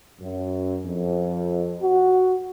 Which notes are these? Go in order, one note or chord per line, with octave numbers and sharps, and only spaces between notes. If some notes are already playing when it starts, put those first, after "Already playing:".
F#2
F2
F#4